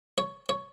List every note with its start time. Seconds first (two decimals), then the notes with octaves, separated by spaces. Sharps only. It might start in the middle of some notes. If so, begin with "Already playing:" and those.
0.18 C#5
0.49 C#5